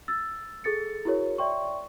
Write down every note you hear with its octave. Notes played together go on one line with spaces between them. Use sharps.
E6 A6
G#4 A4 A6 C#7
E4 F#4 G#4 A#4 C#5
D5 E5 G5 C6 C#6